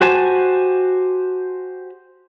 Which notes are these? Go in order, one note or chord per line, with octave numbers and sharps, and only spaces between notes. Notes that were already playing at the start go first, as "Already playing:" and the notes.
F#4 G4 C5 G#5 A5